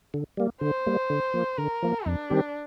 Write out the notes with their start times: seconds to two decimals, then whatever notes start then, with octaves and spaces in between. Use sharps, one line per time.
0.14 D3
0.37 G3 A#3
0.61 D3 C5
0.87 G3 A#3
1.10 D3
1.34 F3 A#3
1.58 D3 A#4
1.83 F3 A#3
2.06 F2 D4
2.30 D#3 G3 C4 G4